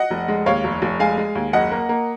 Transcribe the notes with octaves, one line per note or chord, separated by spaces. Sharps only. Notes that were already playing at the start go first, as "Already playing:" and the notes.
Already playing: D#5 F#5
F1
G#3
D#2 C#5 F5
F1
F1
G#3 F5 G#5
G#3
D#2
F#1 D#5 F#5
A#3
A#3